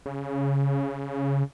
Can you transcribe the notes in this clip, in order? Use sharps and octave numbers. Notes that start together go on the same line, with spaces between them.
C#3